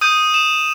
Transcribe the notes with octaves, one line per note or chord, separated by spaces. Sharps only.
D#6 G6 D#7
E7